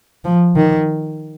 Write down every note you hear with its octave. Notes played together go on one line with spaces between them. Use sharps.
F3
D#3